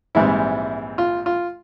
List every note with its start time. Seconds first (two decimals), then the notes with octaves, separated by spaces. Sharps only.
0.15 A#1 G#2 E3 G3 C4 E4
0.98 F4
1.26 F4